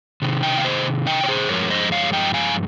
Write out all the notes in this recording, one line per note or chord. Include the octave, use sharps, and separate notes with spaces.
C3 D#3
D#5 G5
F5
C5 D#5
D#5 G5
C#5
G#4 C5
G2 F3 G#3 A#4 C#5
C5 D#5
C#5 F5
D#5 G5
F5 G#5